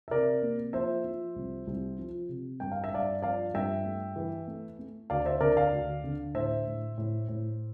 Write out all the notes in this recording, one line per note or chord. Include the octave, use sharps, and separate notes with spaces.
E5
C3 A#4 D5
A#3
F3 C5 E5
F3
C2
C2
F3
C3
G2 G5
F5
E5
G2 D5 F5
F3 D5 F5
G2 E5 G5
A3
E3
A3
A3
D2 D5 F5
C5 E5
D3 A#4 D5
D5 F5
D2
D3
A2 C5 E5
A2
A2
A2